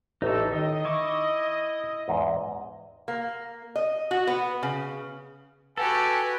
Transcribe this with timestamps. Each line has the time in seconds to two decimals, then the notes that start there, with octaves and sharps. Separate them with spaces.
0.22 A1 G3 D#4 F4 A4 E5
0.52 D#3 D#4 D#5
0.85 E4 C#6 D6
2.08 E2 G#2
3.08 A#3
3.76 D#5
4.11 F#4
4.27 B3
4.63 C#3
5.77 F#4 G4 A4 B4 G#5